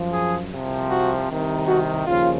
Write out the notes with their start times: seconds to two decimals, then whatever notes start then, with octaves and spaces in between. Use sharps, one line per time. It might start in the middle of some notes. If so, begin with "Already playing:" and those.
Already playing: F#2 F3
0.13 G#4
0.52 C2 C3 F3
0.90 F#4
1.29 C2 C3 D#3
1.67 F#4
2.06 D#2 C#3 F3 F4